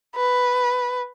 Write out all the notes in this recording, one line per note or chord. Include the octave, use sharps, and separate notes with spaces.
B4